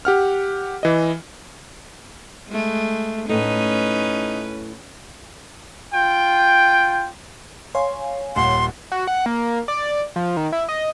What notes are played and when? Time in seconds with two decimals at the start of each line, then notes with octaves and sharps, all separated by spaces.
0.05 G4 F#5 F6
0.83 E3 D#5
2.49 G#3 A3
3.29 A2 A3 C#4 D#4 B4
5.94 F4 G5
7.75 C#5 F5 G#5 C6
8.36 D#1 F#5 C6
8.92 F#4
9.07 F#5
9.26 A#3
9.68 D5
10.16 F3
10.37 D#3
10.52 E4
10.69 D#5